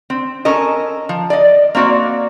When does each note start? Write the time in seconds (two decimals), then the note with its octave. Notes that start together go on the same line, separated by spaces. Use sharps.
0.10 C4
0.45 C#4 A4 A#4 D#5
1.09 F3
1.30 D5 D#5
1.75 A#3 C4 F#4 D5